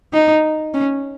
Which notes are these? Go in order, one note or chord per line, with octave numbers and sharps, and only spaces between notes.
D#4
C#4